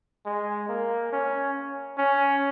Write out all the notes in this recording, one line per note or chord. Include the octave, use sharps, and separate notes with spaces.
G#3
A#3
C#4
C#4